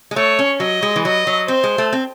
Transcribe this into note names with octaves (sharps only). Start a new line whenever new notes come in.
G#3
A3 C#5
C#4
F#3 D#5
G#3
E3
F#3 D#5
F#3
C4 C5
G#3
A3
C4